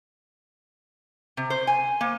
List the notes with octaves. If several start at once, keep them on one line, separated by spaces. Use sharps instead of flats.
C3
C5
G#5
A#3